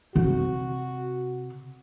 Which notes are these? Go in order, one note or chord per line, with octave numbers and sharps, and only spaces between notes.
C3 F#4